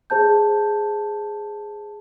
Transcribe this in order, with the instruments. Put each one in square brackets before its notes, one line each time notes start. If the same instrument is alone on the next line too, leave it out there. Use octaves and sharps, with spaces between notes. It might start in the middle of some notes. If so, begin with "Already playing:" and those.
[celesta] G#4 C5 A5 G6